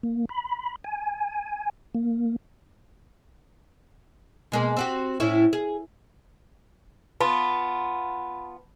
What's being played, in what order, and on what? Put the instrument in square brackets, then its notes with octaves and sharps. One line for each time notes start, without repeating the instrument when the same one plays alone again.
[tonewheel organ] A#3
B5
G#5
A#3
[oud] B2 G#3 A#3
C4 F#4 G4
A2 C#4 E4
G#4
[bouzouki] B3 F4 [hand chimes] A5 B5